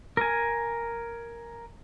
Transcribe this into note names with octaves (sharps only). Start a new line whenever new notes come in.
A#4 G#5